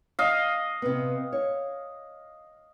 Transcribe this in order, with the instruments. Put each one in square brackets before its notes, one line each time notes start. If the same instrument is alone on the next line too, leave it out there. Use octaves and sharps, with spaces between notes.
[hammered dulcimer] D#5 F5
[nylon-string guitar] C3 B3
C#5